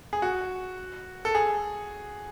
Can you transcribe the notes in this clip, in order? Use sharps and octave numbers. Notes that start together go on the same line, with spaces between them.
G#4
F#4
A4
G#4